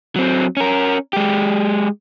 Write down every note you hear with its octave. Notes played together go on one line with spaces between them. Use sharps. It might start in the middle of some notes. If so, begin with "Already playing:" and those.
F#3 C4
C#4 A#4
G#3 G4